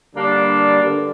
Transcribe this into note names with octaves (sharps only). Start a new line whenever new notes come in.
D3 G3 A#3 D4
G2 D3